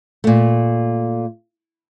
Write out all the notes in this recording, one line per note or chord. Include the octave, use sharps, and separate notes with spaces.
A#2 A3